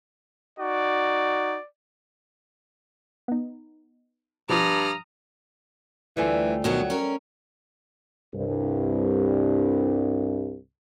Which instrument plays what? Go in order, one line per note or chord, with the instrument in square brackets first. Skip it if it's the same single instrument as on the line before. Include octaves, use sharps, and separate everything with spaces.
[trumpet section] D#4 F#4 [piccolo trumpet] D5
[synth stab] B3 D#4
[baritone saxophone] G2 [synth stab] B2 F3 [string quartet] A#5 D#6 F6
[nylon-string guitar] D2 F4 G#5 [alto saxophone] E3 [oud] G3 A3 C4
[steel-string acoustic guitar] B2 D#3 B3 [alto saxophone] F#3
[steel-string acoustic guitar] C#4 A#4
[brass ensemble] C2 G2